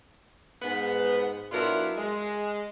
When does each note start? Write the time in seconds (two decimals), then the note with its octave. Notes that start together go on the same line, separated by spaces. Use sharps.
0.62 G#2 B3
1.52 B2 F#3 D4 E4 F4 A#4
1.97 G#3